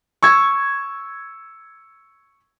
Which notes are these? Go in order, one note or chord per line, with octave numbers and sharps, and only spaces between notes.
C#6 E6 G#6